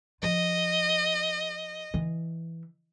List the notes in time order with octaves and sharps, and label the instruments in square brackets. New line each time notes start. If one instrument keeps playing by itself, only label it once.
[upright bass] F3 F4 [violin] D#5
[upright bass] E3